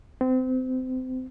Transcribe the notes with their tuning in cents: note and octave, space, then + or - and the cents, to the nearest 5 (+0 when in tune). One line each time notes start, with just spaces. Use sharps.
C4 -30